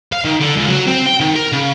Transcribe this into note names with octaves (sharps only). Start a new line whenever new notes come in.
F5
D#3
D3
C#2
F#3
C4
G5
D#3
A#4
C#3